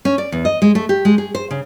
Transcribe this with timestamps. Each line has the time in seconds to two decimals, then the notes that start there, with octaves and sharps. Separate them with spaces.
0.05 C#4
0.18 D5
0.32 E2
0.45 D#5
0.62 G#3
0.75 A3
0.89 G4
1.05 G#3
1.18 G#4
1.35 C5
1.51 C#3